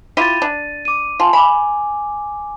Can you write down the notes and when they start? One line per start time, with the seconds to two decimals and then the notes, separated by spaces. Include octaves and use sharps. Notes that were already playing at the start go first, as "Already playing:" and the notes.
0.17 E4 F4 G4 A6 D#7
0.42 D4
0.85 D6 D#7
1.20 F4 G#5 A5 C6
1.33 G#5 B5 D6